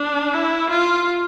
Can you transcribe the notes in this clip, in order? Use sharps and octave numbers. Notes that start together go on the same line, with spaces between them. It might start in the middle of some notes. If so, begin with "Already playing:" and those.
Already playing: D4
E4
F4